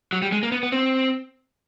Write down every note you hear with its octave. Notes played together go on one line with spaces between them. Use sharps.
F#3
G3
G#3
A#3
B3
B3
C4